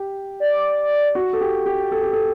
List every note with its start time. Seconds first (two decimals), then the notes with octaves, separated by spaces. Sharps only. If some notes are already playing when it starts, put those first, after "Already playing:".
Already playing: G4
0.40 D5
1.15 F#4
1.33 A4
1.41 G4
1.66 G4
1.92 A4
2.03 G4
2.13 A4